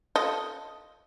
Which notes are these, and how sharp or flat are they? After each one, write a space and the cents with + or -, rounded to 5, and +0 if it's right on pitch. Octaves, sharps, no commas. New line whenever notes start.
F4 +0 A4 +0 D#5 +0